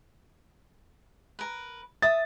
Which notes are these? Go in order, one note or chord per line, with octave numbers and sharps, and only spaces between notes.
A#4 B4
E5 D#6 A6